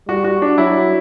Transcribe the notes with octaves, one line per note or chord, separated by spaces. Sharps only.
G3 F#4
F#4
D4
F#3 E4